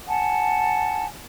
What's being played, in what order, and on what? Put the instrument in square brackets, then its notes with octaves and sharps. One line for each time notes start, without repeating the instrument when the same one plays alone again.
[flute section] F#5 G#5 A5